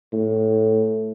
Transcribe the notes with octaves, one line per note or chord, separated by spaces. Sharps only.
A2